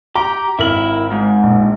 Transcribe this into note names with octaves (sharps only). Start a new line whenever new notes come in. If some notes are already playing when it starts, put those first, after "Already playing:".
G4 A#5
G#1 E4 A#4 F#7
G#2
A#1